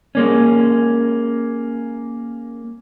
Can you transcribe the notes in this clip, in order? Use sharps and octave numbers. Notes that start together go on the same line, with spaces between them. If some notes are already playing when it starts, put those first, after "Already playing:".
G#3 A#3 C#4